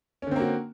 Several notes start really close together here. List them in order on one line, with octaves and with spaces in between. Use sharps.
C#4 D3 C4 A#3 F#4